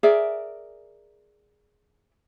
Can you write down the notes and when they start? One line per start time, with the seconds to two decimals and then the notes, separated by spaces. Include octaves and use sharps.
0.03 G#4 A#4 D5 E5